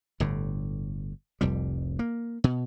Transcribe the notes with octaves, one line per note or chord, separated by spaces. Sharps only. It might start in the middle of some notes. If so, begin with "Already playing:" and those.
G1 A2 D3
F1 C2 F2 G3
A#3
B2